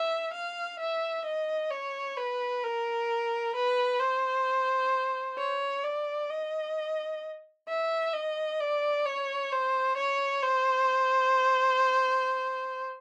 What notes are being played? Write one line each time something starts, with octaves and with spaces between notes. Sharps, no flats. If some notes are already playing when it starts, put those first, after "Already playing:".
Already playing: E5
F5
E5
D#5
C#5
B4
A#4
B4
C5
C#5
D5
D#5
E5
D#5
D5
C#5
C5
C#5
C5